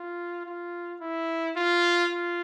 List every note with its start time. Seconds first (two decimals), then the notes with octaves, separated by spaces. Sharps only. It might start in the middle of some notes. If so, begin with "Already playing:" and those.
Already playing: F4
0.46 F4
1.01 E4
1.56 F4
2.10 F4